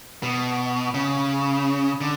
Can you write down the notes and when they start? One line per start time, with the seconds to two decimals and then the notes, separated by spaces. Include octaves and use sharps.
0.23 B2
0.94 C#3
2.01 D3